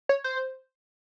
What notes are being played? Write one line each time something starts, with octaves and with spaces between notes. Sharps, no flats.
C#5
C5